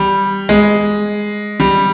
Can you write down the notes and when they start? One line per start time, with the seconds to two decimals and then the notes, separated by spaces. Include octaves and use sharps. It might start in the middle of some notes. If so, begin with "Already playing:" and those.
Already playing: G3
0.49 G#3
1.60 G3